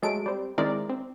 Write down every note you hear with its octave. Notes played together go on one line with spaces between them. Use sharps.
F#3 G#3 A3 D7
G3 C4
D#3 G#3 C4 E4 A#4 D5
C4